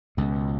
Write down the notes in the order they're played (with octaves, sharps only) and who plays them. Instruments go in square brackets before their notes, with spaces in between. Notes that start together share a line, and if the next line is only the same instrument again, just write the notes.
[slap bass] C#2 B2